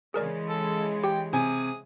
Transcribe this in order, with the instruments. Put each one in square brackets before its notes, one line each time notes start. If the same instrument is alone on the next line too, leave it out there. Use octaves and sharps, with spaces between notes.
[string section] C#3 E3 G#3 [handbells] G#4 A#4 D5
[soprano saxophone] A4
[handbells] G4 [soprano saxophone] G5
[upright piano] C3 G#5 [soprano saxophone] G#4